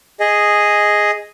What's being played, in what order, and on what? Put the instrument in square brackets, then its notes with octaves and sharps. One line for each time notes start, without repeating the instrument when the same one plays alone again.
[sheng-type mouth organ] G#4 D#5